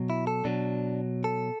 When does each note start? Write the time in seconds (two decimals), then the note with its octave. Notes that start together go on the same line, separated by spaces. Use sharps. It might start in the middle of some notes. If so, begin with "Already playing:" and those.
Already playing: B2 F#3
0.10 E4
0.27 A4
0.45 B2 F#3 D4
1.24 A4